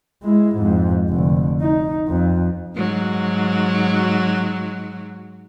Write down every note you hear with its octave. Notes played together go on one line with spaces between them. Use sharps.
G#3 E4
F2 G#2
F1 D3
D#4
F2
G#2 F#3